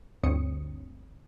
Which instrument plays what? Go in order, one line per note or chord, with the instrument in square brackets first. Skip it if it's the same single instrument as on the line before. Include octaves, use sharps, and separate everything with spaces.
[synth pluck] G1 D2 C4 C#5 D#6 C#7